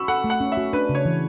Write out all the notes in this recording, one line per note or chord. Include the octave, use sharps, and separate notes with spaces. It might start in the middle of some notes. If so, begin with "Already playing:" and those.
Already playing: F#4 B5 C#6 E6
A4 F#5
A3
F#5
C#4
E5
F#4
D4 B4
C#3
C#5
E3